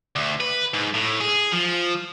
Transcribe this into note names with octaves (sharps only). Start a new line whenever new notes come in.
D2
B4
G#2
A2
G#4
F3